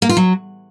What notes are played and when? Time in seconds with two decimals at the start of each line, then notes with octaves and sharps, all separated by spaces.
0.02 A#3
0.09 F4
0.17 F#3